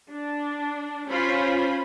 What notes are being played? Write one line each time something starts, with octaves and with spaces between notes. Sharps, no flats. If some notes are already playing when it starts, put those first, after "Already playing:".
D4
C#4 F4 C5 B5